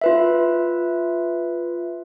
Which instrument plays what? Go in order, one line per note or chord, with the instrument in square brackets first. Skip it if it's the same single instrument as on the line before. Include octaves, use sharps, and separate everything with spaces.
[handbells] F4 B4 E5